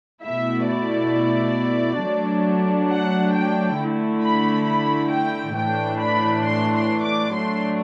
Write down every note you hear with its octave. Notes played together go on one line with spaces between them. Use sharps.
B2 A3 E4 E5
D5
F#3 A3 D4
F#5
G5
D3 A3 E4
B5
B5
G5
A2 E3 A3 D4 G5
B5
C6
C6
D6
F#3 A3 D4 C6